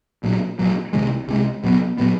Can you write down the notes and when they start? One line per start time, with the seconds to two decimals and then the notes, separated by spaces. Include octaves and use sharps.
0.23 A#1 A#2 F#3
0.59 A#1 A#2 F#3
0.93 C2 C3 D#3 G#3
1.28 C2 C3 D#3 G#3
1.63 C2 A#2 F#3 B3
1.98 A#2 F#3 B3